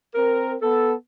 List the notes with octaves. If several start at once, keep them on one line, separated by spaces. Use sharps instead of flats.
C4 A#4
B3 A4